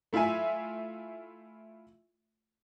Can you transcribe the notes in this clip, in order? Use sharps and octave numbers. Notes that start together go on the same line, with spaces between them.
A3 E4 F4 E5 G#5